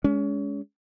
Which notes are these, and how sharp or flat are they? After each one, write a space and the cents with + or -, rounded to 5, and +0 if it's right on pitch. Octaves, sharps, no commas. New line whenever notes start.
G#3 +0 C#4 +30